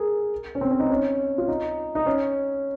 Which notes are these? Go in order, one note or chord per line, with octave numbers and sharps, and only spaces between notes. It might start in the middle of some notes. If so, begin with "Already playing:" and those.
Already playing: G#4 A#4
C#4
C4
C#4
D#4
C#4
F4
D#4
D#4
C#4